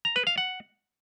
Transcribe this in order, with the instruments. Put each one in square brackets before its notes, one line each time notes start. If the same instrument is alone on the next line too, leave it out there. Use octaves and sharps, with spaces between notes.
[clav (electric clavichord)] A#5
B4
F5
F#5